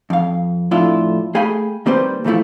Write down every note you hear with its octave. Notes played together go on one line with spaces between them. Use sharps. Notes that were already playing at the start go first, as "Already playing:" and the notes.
F2 F5
F2 A2 D4 E4 F4
A3 G#4 F5 G5 G#5 B5
D#3 G3 A#3 C4 B4 C5
A#2 E3 F3 A3 E4